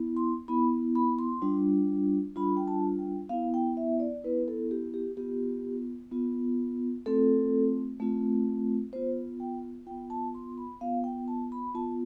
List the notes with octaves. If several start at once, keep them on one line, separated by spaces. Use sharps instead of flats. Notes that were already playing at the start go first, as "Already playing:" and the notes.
Already playing: B3 E4
C6
B3 E4 B5
B5
C6
G3 D4 F4
G3 D4 F4 B5
G5
A5
G5
B3 E4 F5
G5
E5
D5
B3 E4 B4
A4
G4
G4
B3 F4 G4
B3 F4
A3 C4 F4 A4
A3 C4 F4
B3 F4 C5
G5
B3 F4 G5
A5
C6
B5
B3 F4 F5
G5
A5
B5
B3 F4 A5